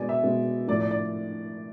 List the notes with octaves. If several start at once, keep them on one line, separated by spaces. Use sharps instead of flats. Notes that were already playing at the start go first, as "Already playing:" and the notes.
Already playing: B2 G#3 B3 D5 G#5
E5
B2 G#3 B3
A2 F3 A3 D5
D5
D5